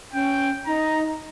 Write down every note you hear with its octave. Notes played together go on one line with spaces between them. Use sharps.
C#4 G5
D#4 A#5